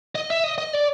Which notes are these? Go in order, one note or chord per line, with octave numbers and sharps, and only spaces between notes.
D#5
E5
D#5
D#5
D5